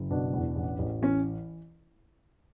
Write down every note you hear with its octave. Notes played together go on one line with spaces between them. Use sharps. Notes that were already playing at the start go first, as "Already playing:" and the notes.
Already playing: F#1
B2 D4
E2
A1
A1
E3 C#4